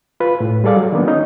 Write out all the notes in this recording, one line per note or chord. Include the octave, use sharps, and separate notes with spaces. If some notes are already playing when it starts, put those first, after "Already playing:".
F4 B4
A2
G3 G#4 A4 D5 F5
F#3
D#3 F3 A#3 B3 D4
C#4 D#4